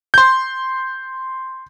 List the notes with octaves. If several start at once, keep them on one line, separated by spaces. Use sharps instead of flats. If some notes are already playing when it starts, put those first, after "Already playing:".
C6 G6